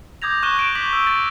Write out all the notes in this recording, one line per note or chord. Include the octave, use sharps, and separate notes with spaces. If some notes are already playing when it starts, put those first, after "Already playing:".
D6 D#6 G6 G#6 A#6 F7
C#6 D#6 F#6 D#7 E7 G7
F#6 D7 E7
D6 B6 F#7 G7
D#6 E6 G7
A6 F#7